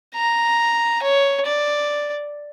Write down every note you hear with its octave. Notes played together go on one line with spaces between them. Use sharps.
A#5
C#5
D5